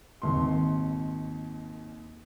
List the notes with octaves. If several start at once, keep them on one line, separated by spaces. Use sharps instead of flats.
G#1 D#2 C6